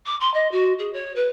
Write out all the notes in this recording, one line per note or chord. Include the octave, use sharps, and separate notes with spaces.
D6
C6
D#5
F#4
G#4
C#5
B4